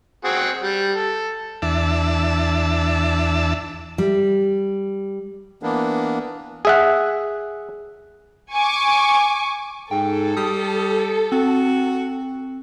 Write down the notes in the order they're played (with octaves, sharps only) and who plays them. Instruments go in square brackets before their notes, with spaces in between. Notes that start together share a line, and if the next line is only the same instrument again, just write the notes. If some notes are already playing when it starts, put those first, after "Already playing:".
[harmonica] C4 F#4 G#4
G3
A4
[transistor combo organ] E2 D4 E5 A5
[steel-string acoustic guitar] G3
[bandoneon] E3 A#3 B3 D4
[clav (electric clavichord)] G#4 E5 F#5
[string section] G#5 C#6 D6
[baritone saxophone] G#2 [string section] A4 [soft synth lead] G5
[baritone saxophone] G3 [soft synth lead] D#6
[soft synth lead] C4 [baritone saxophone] F#4